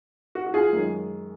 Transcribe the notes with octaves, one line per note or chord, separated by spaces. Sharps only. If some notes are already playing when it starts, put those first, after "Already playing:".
F#4
F#4
F4 G#4
F#2 D#3 G#3